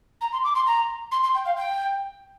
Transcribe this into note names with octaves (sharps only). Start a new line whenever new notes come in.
A#5
C6
D6
C6
A#5
C6
C6
G5
F5
G5